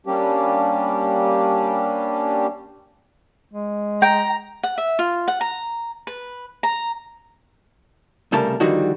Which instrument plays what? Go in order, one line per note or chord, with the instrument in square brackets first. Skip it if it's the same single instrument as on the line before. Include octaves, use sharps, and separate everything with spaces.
[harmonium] G3 A#3 C#4 D4 G4
[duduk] G#3
[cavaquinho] G5 [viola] A#5
[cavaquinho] F#5
E5
F4
F#5
A#5
B4
A#5
[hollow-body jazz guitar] C2 C#3 G3 A3 A#4 A5
D3 D#3 F3 G3 D#4 F#4